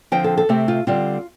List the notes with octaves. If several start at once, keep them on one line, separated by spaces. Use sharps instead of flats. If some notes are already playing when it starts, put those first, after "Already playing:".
D3 F3 C4 G5
A4
A4
C3 A3 C4 G4
F4
D3 G3 C4 F4